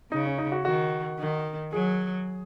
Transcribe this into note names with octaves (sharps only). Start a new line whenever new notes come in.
C#3 D#4
C#4
D#4
F#4
D#3 F#4
D#3
F#3 G#4